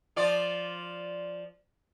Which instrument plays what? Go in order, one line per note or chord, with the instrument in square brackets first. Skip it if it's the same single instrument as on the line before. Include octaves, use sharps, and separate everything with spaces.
[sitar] F3 F4 D5